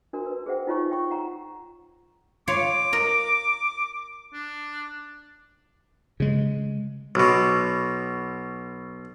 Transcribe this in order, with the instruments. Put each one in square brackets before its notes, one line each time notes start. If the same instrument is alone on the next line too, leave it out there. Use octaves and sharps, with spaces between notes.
[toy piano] D4 F#4 A#4 A5
B4
G#4 C5 E5 F#5 G5
D#4 F4 C#5 C#6
E5 G5 C#6
F#5 A#5
[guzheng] F4 C#5 F5 [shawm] D6
[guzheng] A#4 D#5
[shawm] D4
[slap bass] C#3 G#3
[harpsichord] B1 B2